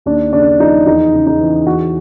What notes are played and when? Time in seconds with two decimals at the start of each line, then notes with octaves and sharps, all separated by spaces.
0.06 D#2 D4
0.33 C#3 D4
0.60 F3 D#4
0.86 E2 D#4
1.13 C#3
1.27 D#4
1.40 E3
1.66 E2 F#4